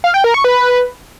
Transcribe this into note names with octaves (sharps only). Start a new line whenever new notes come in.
F5
G5
A#4
C#6
B4